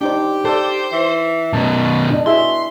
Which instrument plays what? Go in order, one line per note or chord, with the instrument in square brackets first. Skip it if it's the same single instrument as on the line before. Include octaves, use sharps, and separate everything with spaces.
[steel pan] D4 D#4 C5 [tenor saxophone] G4
[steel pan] A4 D5 [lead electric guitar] C5
[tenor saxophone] E3
[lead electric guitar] F#2 B2 [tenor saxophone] D#3 [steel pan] A5 A#5
[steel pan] D4 D#5
[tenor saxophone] B2 [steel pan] E4 G#4 E5 [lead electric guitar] C6